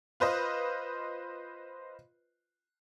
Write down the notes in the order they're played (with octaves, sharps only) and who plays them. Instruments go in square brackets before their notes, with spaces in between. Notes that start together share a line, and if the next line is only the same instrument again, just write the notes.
[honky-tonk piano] F4 B4 C5 D#5